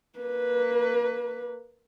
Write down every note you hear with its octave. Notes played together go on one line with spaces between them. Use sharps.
A#3 B4